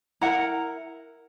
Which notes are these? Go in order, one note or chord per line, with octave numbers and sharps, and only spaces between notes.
E4 A#4 F#5 A#5